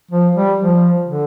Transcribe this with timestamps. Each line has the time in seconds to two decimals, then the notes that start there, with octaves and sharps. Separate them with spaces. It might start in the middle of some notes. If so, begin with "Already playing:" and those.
0.11 F3
0.35 G3
0.58 F3
1.05 D3